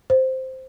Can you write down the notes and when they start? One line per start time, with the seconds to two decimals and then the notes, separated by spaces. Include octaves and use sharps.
0.10 C5